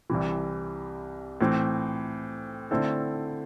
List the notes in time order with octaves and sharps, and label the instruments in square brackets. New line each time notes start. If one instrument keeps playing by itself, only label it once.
[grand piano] C2 C3 E3
A2 E3 C4
D3 A3 C4 E4 A4